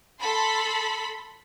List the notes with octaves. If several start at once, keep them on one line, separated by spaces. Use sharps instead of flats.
A4 B5 C6